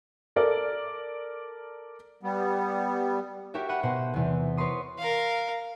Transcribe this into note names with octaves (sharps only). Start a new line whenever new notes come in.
A4 A#4 D5
G3 B3
F#4 G4 A#4 C#5 E5
E5 F#5 B5 C#7 D#7
B2 C5 F#5
E2 C3
A#4 B4 C#5 B5 C6 D#6
A#4 F5